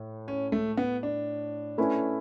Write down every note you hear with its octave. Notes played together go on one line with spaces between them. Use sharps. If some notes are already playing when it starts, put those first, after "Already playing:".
Already playing: A2
C#4
A3
B3
D4
A3 C#4 E4 B4